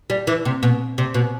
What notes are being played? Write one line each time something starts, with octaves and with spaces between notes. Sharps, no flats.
G3
E3
C3
B2
C3
B2